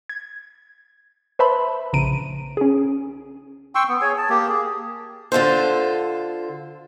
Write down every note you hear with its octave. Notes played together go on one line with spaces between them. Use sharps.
G#6
B4 C5 E5 A5 B5 C6
A#1 C#3 A#5 D7 D#7
C#4 G#4
G5 C6 C#6 E6
B3
G#4 C#5 G#5
A5
A#3 G4
G#4
D3 F4 A4 C5